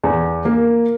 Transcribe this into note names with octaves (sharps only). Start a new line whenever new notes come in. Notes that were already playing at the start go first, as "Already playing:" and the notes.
E2
A#3